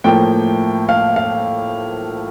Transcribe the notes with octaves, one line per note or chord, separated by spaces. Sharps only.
A2 F3 A#3 G5
F5
F5